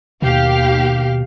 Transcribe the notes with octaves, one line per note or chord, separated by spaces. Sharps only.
D#2 B2 G4 F5